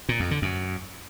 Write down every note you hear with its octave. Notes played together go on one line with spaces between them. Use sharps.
A#2
F2
D3
F#2